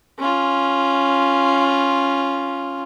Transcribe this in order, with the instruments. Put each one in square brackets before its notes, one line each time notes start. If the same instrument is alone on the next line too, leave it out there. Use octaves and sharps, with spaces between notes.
[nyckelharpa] C#4 F4